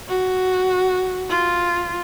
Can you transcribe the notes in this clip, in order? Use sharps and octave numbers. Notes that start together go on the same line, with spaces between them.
F#4
F4